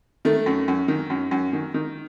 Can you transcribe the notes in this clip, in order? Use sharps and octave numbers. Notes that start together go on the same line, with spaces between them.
D#3 A3
F#2
F#2
D#3
F#2
F#2
D#3
D#3